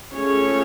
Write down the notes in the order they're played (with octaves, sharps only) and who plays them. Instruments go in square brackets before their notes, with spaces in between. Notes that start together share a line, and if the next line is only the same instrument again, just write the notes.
[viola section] A3 C#4 F4 G#4 C#5